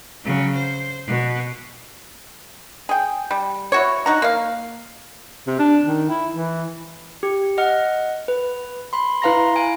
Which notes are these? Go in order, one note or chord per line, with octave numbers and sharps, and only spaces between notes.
C#3 F#3
C5
B2
G#4 G5
G3
E4 F#4 C#5
D#4 F#4 A#5
A#3 F5
C3
D4
D#3
E4
E3
G4
D#5 F#5 F6
B4
B5 C6
E4 B4 F5 A#5 C6 A#6
F5 G#5 D7